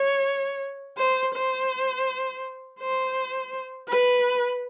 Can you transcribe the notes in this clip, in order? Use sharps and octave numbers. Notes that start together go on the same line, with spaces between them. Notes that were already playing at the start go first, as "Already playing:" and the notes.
Already playing: C#5
C5
C5
C5
B4